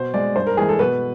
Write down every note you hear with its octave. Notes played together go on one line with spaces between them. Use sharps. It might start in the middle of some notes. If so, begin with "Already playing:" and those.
Already playing: B2 C5
G#3 D5
G2 C5
A#4
E3 G#3 G#4
A4
B2 B4